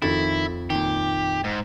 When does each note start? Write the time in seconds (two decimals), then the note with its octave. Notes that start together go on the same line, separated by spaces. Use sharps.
0.02 F2 D#3 E4 A4 A6
0.70 A#2 D#3 G4
1.44 G#2